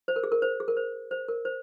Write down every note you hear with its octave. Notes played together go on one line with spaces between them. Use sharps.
C5
A#4
G#4
A#4
C5
G#4
A#4
C5
C5
A#4
C5